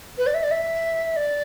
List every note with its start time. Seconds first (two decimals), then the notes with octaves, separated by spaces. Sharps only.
0.18 B4
0.27 D5
0.34 E5
0.43 D5
0.51 E5
1.16 D5